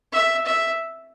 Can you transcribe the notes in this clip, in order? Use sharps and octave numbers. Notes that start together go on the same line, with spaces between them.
E5
E5